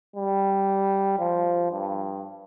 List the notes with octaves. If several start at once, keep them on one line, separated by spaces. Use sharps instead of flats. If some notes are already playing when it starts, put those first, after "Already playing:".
G3
F3
G2